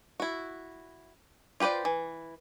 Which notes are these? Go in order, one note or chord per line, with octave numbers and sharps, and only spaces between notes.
E4 F#4
F4 G4 B4 C5 D5
E3